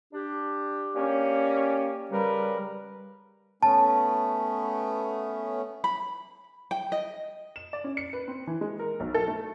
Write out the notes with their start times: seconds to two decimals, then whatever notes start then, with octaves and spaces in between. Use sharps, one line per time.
0.13 D4 G4
0.96 A#3 C#4 G4 D5
2.11 C#3 G3 A#4 B4
3.63 A3 B3 C#4 A5
5.84 B5
6.71 G5
6.92 D#5
7.56 E7
7.73 D5
7.84 C#4
7.97 C#7
8.13 B4
8.28 C4
8.47 E3
8.61 G#3
8.79 A#4
9.00 B1
9.14 A4
9.28 A3